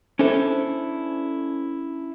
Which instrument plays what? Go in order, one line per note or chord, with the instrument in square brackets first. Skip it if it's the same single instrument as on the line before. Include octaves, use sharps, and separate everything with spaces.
[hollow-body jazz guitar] C#4 D4 E4 A4 C5